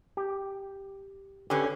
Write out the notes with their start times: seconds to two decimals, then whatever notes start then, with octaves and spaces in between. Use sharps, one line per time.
0.17 G4
1.50 D3 C#4 G4 B4